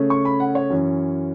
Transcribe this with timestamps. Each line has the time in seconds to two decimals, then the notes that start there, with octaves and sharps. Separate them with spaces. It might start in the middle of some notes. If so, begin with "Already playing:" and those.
Already playing: C#3 A3 C#4
0.10 C#6
0.25 B5
0.40 F#5
0.55 C#5
0.70 F#2 E3 C#4